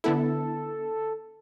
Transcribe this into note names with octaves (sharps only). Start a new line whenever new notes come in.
D3 B3 E4 A4